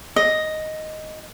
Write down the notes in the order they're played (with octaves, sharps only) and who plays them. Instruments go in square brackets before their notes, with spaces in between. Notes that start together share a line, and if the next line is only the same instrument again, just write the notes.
[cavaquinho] D#5